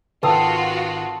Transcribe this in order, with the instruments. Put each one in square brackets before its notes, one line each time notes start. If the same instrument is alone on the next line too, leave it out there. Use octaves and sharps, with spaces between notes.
[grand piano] G#1 [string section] F4 F#4 [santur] A4 D#6 [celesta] B4 G5